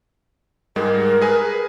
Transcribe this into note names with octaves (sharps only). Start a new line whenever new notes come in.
G#2 G3 G#3 A#4
G#4 B4 G#5